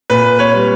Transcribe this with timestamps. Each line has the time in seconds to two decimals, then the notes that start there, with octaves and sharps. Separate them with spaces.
0.10 A#2 B4
0.39 B4 C#5
0.54 G3